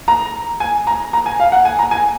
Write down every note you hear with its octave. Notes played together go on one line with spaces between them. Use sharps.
A#5
G#5
A#5
A#5
G#5
F5
F#5
G#5
A#5
G#5